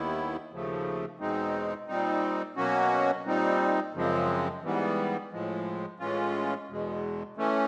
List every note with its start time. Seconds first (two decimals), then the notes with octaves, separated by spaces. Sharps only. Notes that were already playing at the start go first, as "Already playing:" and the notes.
Already playing: D#2 D#3 G3 B3 E4
0.50 D#2 C#3 F3 A3
1.19 E2 B2 G#3 C4 D#4
1.87 A#2 G3 C4 D#4
2.56 B2 F#3 A#3 C#4 F#4
3.25 A#2 G3 C4 D#4
3.94 F#2 C#3 F3 G#3 C4
4.62 G#2 E3 G3 B3
5.31 A2 F3 G#3
5.99 A2 E3 G#3 C#4 F4
6.68 E2 B2 G#3
7.37 E3 A3 C#4